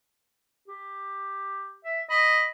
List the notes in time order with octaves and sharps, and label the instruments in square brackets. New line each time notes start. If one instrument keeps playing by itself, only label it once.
[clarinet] G4
E5
[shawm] D#5 [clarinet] B5